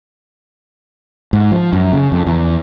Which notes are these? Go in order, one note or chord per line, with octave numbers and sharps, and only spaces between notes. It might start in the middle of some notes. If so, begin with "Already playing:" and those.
G#2
F3
F#2
C#3
F2
E2